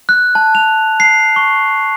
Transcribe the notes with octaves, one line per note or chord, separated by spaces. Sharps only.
F#6
A5
F7
C7
C#6